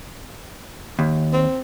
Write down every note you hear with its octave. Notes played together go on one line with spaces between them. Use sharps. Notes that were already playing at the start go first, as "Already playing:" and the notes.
D#2
C4